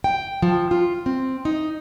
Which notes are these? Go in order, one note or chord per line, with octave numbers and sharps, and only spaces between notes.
G5
F3
F4
C4
D#4